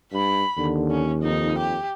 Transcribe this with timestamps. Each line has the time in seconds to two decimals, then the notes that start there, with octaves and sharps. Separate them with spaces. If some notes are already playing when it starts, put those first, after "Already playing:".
0.12 G2 B5
0.58 D#2 D3
0.90 C#4
1.23 F2 D#4
1.58 G4